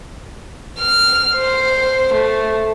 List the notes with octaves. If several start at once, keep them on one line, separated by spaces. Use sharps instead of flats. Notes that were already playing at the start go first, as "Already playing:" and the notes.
F6
C5
A3